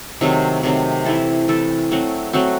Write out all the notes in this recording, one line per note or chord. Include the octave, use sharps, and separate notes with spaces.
C3 D#3 F#3 A3
C3 D#3 F#3 A3
E3 A3 E4 A4
E3 A3 E4 A4
F#3 A3 C4 F#4
F#3 A3 C4 F#4